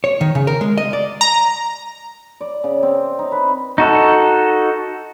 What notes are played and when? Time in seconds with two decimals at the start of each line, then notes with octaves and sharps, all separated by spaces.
0.04 C#5
0.21 D#3
0.35 C#3
0.47 A#4
0.61 G#3
0.78 D#5
0.93 D5
1.21 A#5
2.41 D5
2.64 C#3
2.83 C4
3.19 D#4
3.32 B4
3.78 D#4 F#4 A4